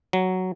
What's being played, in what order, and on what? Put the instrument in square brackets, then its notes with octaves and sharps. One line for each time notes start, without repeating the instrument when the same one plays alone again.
[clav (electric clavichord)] F#3